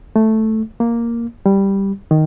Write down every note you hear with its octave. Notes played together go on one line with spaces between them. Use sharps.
A3
A#3
G3
D#3